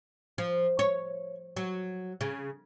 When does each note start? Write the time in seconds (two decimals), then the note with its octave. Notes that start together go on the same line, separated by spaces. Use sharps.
0.38 F3
0.79 C#5
1.56 F#3
2.21 C#3